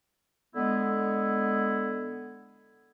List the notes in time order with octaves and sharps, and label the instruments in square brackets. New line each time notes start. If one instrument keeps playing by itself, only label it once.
[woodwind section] D3 G#3 B3 E4